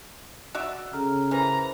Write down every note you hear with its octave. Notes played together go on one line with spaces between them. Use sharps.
F#4 D5 E5
C#3 A4 A#5 F6
E3 A#4 C5 A#5 B5